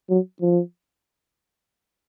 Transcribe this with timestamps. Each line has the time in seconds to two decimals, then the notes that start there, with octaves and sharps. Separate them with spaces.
0.09 F#3
0.41 F3